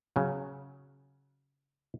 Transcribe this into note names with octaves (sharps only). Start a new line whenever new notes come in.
C#3 F#3